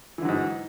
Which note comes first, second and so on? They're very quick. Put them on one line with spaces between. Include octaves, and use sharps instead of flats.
E3 D3 F#3 G#2